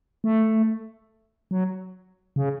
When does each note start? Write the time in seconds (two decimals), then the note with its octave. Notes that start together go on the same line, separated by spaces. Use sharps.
0.24 A3
1.51 F#3
2.36 C#3